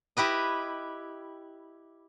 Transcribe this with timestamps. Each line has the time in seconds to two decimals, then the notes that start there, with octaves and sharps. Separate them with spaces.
0.17 E4 G4 B4 D#5